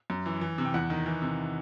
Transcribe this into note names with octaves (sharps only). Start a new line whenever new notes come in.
F#2
E3
E3
C3
G5
E2 F#5
D#3
E3
C3